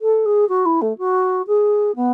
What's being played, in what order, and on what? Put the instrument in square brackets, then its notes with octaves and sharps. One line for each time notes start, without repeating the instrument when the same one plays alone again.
[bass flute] A4
G#4
F#4
E4
A3
F#4
G#4
B3